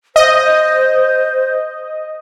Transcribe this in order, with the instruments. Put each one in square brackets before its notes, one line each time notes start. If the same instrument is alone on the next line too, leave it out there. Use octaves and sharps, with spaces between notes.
[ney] C5 [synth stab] D#5